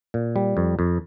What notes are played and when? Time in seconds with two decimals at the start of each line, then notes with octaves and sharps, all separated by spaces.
0.14 A#2
0.36 G3
0.57 F2
0.79 F2